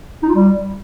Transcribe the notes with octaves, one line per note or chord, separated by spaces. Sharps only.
D#4
F4
G3